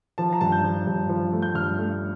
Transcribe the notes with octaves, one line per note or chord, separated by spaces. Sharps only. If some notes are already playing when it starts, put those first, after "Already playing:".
F3 A5
A#5
G2 A5
G6
F3
G2
F3
A3
G6
G2 F6
A3